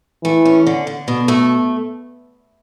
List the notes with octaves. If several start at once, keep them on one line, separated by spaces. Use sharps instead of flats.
E3 A3
C#4
D3
D3
B2
A3